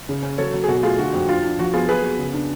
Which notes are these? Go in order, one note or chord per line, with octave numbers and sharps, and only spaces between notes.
C#3
C#4
F#3 A4 C#5
F#3
G#4
B2 F#4 A4
A3 F4 G#4
D3 F#4
F2
D4 F4
D4
F3 F#4
B3 F4 G#4
F#3 G#4 B4
B3
C#3
D4